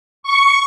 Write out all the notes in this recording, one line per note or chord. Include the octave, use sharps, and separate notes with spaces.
C#6